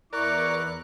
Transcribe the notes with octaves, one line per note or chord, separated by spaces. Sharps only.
E2 E4 A#4 D5 C#6 F#6